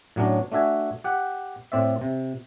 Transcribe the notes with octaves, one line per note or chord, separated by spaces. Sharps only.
A2 F#3 C#4 D4
A3 D4 F#4 E5 G#5
G4 F#5
A2 C4 D5 E5
C3